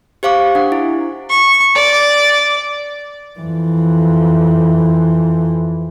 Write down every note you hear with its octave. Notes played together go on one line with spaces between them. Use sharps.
G4 C5 F5 C#6 D6
D4 F#5
E4
C#6
D5
F2 E3